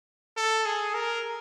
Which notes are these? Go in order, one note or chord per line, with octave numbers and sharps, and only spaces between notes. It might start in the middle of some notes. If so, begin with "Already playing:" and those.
A4
G#4
A#4